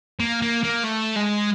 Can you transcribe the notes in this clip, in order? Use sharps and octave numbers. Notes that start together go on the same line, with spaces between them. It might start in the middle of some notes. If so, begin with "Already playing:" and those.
A#3
A#3
A#3
A3
G#3